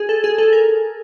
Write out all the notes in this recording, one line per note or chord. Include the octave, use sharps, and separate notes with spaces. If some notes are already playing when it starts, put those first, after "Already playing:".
Already playing: G#4
A4
G#4
A4
A#4